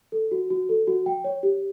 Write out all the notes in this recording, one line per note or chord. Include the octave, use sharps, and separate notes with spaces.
A4
F#4
F#4
A4
F#4
G5
C#5
G4